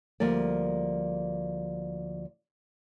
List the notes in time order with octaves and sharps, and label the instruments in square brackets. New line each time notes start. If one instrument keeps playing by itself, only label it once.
[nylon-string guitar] D2 F3 G3 A#3 D5